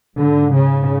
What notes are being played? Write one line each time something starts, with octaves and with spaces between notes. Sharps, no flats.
G#2 D3
C#3